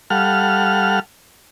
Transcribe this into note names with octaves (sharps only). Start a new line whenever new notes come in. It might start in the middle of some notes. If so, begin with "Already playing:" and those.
G3 A4 F5 F#5 F6